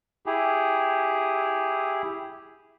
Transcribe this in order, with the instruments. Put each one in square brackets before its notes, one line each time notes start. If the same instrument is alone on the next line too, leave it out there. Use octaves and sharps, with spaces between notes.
[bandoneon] E4 G4 G#4